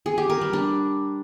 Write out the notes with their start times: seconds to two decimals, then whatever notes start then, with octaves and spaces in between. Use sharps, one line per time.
0.06 G#4
0.18 G4
0.30 A#4
0.41 G3
0.53 D4